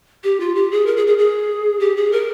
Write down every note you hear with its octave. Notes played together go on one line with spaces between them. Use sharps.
G4
F4
G4
G#4
A#4
G#4
G#4
G#4
G4
G#4
A#4